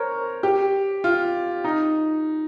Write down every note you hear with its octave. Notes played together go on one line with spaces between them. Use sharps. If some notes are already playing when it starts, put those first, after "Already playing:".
Already playing: A#4 C5 C#5
G4
F4
D#4